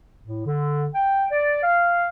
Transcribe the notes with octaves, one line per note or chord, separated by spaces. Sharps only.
A2
D3
G5
D5
F5